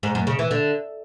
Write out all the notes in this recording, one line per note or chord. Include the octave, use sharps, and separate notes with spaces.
G#2
F#2
C#3
E3
D3